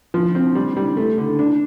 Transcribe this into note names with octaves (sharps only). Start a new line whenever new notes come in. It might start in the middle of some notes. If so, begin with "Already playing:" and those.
F3
C4
G3
G3
A3
D3
D4